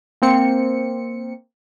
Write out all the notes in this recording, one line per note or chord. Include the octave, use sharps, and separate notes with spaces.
A#3 C4 C#7